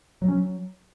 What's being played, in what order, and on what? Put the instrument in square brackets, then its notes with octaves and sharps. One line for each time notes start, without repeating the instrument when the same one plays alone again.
[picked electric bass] F#3
C#4
F#3